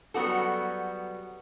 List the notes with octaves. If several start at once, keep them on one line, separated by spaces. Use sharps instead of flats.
F#3 G3 B3 F#4 A4